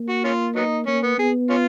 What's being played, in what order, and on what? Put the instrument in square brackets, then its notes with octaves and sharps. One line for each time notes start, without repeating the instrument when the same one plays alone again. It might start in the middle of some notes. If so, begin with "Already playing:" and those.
Already playing: [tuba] A#3
[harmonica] F#4
C#4 F4
F#3 B3 D#4
[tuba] A#3 [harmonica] C#4
[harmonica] B3
[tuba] B3 [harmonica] G#4
[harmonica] C#4 F4